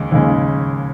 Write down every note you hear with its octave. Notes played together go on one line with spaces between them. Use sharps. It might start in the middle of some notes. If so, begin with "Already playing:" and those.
Already playing: D#2 C#3 G#3
D#2 C#3 G#3